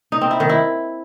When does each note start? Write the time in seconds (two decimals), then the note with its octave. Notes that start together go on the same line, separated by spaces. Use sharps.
0.12 D#4
0.21 C4
0.31 E4
0.40 D#3
0.49 E4